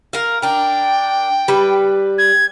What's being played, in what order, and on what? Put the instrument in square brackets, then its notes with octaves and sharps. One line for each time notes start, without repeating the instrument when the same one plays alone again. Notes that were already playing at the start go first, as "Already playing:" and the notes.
[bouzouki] A#4 F5
[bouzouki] D4 A#4 [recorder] G5
[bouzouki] G3 B4
[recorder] G#6